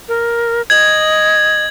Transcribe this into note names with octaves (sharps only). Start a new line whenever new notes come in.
A#4
D#5 G#6 F#7